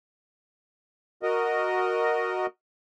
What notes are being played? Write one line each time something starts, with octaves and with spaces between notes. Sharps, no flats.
F#4 A#4 D#5